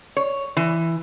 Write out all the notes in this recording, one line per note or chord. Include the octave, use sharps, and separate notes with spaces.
C#5
E3